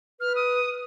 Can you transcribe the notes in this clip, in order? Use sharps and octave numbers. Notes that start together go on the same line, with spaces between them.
B4 F6
D#6